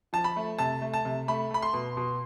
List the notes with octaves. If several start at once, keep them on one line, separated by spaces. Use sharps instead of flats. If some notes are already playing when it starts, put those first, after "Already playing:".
F3 A5
B5
A3
C3 A5
A3
A5
C3
A3 B5
A3 B5
C6
B2
B2